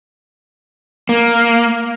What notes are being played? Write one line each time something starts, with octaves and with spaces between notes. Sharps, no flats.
A#3